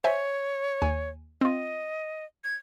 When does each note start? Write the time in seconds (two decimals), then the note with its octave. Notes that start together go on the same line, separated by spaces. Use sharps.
0.04 C5 C#5 E5 G#5
0.82 D#2 G#5
1.41 C4 F4 D#5
2.44 G#6